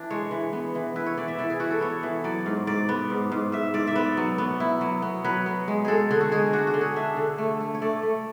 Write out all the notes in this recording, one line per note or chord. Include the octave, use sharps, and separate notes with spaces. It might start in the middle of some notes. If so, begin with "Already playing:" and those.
Already playing: E3 D4
G#3 C#5
E3
B3
E3
E4 B4
C#5
E3 D5
E5
E3 D5
G#4
E3 F#4
A4
B3 C#5
E3
F#3 D5
G#2
G#2 D5
B3
G#2
G#2
G#2 E5
G#2 D5
E5
B3 D5
F#3
B3
E4
F#3
B3
F#3 B4
B3
G#3
G#3 G#4 A4
D3 G#4
F#4
G#3 G#4
D4 F#4
F#4
D3
G#4
D4 E5
D3
A3
A3
C#5
A3 D5
A3